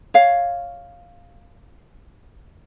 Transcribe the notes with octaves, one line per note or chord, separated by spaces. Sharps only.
C#5 F5